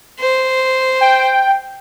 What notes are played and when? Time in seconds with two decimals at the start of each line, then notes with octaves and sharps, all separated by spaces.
0.19 C5
1.01 G5